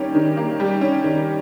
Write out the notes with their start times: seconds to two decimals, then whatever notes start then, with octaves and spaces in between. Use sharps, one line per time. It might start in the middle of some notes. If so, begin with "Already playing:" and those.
Already playing: D#3 G3 A#3 C#4
0.15 D#3
0.37 A#3
0.60 G3
0.81 C#4
1.04 D#3